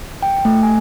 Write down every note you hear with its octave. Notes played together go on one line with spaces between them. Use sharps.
G5
A3
G#5